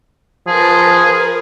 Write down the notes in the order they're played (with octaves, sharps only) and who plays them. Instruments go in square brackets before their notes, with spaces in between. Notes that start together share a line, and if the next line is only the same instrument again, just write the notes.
[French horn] F3 [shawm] G#4 [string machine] A#4 B4